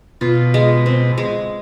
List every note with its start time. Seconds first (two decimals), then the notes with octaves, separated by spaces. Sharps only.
0.21 B2 F4
0.54 G#3
0.86 C4
1.18 G#3